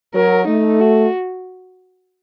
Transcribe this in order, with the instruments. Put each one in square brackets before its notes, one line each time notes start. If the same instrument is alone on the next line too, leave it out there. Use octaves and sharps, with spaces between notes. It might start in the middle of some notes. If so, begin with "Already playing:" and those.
[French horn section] F#3 [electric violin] A#4
[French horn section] A3 [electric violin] D#4
[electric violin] F#4